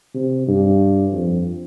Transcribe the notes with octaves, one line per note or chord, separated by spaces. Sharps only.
C3
G2
F2